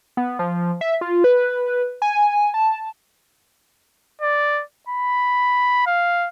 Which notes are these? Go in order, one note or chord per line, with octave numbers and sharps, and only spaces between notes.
B3
F3
E5
F4
B4
G#5
A5
D5
B5
F5